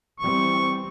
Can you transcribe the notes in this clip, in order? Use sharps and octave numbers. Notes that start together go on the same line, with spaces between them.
E3 G3 C4 C#6